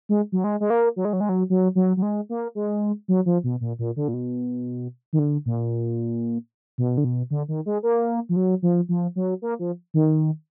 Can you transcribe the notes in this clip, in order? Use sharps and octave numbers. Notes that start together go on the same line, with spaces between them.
G#3
F#3
G#3
G#3
A#3
F#3
G#3
F#3
G#3
F#3
F#3
F#3
F#3
G#3
A#3
G#3
F#3
F3
B2
A#2
A#2
D3
A#2
B2
D#3
D3
A#2
B2
D3
B2
D3
D#3
G#3
A#3
F3
F#3
F3
F3
F#3
A#3
F3
D#3